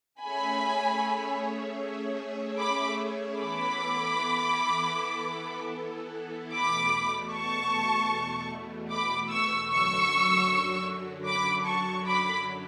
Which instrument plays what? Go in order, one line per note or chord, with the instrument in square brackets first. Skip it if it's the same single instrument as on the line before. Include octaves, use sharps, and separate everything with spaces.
[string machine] A3 C#4 G#4 C#5 E5 [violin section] G#5 B5
[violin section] B5 D6
[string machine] E3 B3 E4 A4 [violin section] B5 D6
[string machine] E2 B2 A3 [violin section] B5 D6
[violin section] A5 C#6
B5 D6
C#6 E6
[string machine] F#2 D3 F#3 [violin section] C#6 E6
[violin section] B5 D6
A5 C#6
B5 D6